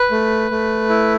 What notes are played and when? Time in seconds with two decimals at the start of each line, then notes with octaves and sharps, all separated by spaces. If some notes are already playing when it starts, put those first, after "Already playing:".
Already playing: B4
0.11 A3
0.51 A3
0.89 E4